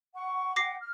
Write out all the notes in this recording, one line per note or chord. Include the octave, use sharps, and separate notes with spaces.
F#5 C#6
F#5 G5 D6 A#6 C7
F6